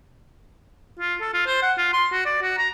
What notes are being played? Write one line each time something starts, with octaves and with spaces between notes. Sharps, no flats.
F4
A4
F4
C5
F#5
F4
C6
F#4
D5
F#4
A#5